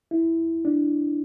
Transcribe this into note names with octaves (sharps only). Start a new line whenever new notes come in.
E4
D4